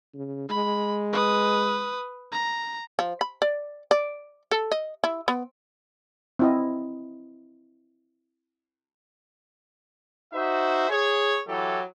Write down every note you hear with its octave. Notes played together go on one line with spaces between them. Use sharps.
C#3
G#3 B5
B4 D#6
A#5
F3
B5
D5
D5
A4
D#5
E4
B3
C4 E4 D#5
D#4 F#4 C5 E5
G#4 C#5
E3 F#3 E4 G4 A4